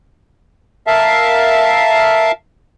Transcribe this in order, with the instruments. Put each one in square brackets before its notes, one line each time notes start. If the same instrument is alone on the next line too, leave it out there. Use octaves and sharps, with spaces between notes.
[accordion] A#4 E5 F5 A5